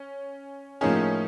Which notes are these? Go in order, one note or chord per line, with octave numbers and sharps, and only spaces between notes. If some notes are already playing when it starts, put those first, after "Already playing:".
Already playing: C#4
A2 F3 A#3 C#4 D#4 G#4